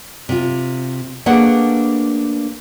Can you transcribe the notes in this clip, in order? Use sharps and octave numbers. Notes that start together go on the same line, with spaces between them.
C3 F4
A3 A#3 D4 G#4 B4 F#5